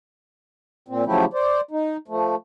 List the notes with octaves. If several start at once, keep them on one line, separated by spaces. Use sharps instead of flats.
A#2 C4
C#3 F3 F#3 A3 E4 G4
C5 D5
D#4
F3 A3